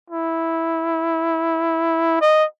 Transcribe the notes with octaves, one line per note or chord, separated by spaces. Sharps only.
E4
D#5